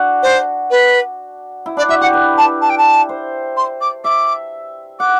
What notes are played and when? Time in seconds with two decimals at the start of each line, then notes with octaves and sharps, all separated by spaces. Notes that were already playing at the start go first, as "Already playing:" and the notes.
Already playing: D4 F#4
0.22 C5
0.70 B4
1.66 E4
1.77 D4 D5
1.89 F#4 E5
2.01 G4 F#5
2.13 B4
2.37 A5
2.61 A5
2.69 G5
2.77 A5
3.09 C5
3.56 C6
3.80 D6
4.04 E5 D6
4.99 F#5 D6